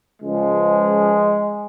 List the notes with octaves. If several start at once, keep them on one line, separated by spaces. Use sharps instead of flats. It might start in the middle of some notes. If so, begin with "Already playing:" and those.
C#2 C#3 F3 G#3